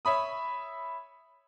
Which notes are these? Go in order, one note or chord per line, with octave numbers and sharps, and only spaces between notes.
C#5 E5 B5 D#6